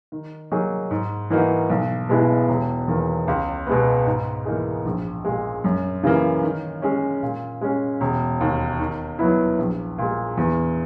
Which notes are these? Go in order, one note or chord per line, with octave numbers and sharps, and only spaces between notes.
D#3
F#3 A#3 D#4 G#4
G#2
E3 A#3 D#4 F#4
B1
B2 G#3 B3 E4
E1
E2 D#3 A#3
C#2
B2 G#3 B3
G#2
E3 A#3 D#4 G#4
A#1
A#2 G#3
F#2
C#3 E3 A#3
D#3
G#3 C#4
A#2
G#3 C#4
E1
D#2 D#3
D#3
F#3 B3 E4
A#1
A#2 G#3
E2